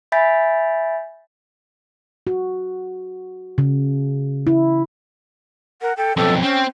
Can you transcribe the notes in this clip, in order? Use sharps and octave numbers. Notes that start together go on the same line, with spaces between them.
E5 G#5 B5 G6 A6 B6
F#4
C#3
E4
A#4 F#5
A4 G5
B1 F2 A4 G5
C4 C#4 G5